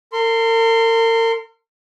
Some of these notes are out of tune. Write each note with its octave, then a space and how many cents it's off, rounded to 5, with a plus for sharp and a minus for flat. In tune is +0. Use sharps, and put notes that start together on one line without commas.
A#4 -40 C6 +0